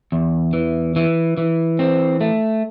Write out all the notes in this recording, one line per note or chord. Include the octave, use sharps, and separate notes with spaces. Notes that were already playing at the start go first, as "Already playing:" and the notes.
E2
E3
E3
E3
C4
A3